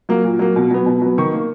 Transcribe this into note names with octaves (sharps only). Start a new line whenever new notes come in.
F#3 A#3
A#2
F#3 A#3
B2
F#3 B3
B2
F#3 B3
D#3 C#6
A#3